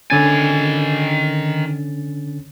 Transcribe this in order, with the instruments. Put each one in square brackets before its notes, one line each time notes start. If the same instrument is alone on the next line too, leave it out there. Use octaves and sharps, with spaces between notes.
[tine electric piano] D3 C#4 A6 [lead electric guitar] D#3 G#5